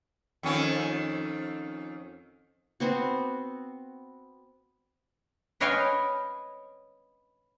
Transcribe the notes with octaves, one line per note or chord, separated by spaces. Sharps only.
F2 D#3 C#4
B3 C4 F#4
B4 C#5 D#5 F5 G5 G#5